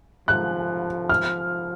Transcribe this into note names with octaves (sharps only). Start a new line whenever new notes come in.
F3 F#6
F6